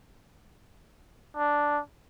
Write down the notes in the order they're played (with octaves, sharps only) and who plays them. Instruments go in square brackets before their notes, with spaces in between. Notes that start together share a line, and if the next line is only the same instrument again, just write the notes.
[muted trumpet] D4